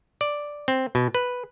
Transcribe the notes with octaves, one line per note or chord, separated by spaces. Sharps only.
D5
C4
B2
B4